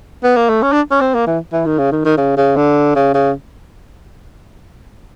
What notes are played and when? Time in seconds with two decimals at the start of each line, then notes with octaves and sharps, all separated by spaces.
0.24 B3
0.36 A#3
0.49 A3
0.62 C#4
0.72 D4
0.91 C#4
1.01 C4
1.14 A#3
1.27 E3
1.53 E3
1.66 D#3
1.79 C#3
1.92 D#3
2.05 D#3
2.18 C#3
2.37 C#3
2.56 D3
2.95 C#3
3.14 C#3